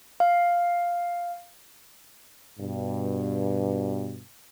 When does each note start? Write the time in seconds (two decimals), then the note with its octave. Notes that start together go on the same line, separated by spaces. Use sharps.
0.20 F5
2.60 G2 B2